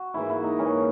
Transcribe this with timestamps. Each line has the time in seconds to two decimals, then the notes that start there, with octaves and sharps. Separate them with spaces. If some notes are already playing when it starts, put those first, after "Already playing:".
Already playing: F#4
0.14 G#2 E3 A#3 E4
0.30 E4
0.44 D#4
0.59 G#2 E3 A#3 C#4